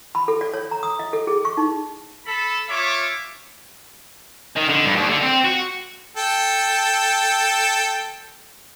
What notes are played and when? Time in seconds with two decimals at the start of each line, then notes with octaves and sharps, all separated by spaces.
0.15 B5
0.28 A4
0.41 D5
0.54 C#5
0.71 A#5
0.83 D#6
0.99 D#5
1.13 A4
1.27 G#4
1.45 C#6
1.57 D#4
2.25 A4 B5
2.68 F4 C#5 E5 D6
4.56 D#3
4.69 D3
4.85 G2
4.96 D#2
5.09 D3
5.21 C4
5.45 F#4
6.17 A4 G5